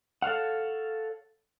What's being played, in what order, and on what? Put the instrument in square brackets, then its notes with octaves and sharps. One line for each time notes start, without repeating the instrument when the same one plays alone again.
[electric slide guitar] A4 C#5 F5 F#5